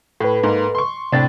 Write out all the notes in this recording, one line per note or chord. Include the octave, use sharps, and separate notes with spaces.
A2 A4 B4
G#2 A#3
C6 C#6
A2 C3 C4 D4 A6